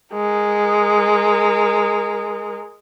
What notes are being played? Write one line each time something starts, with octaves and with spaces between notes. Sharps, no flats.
G#3 A#4